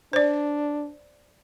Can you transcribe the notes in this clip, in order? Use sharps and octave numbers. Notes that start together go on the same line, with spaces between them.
D4 C5 D5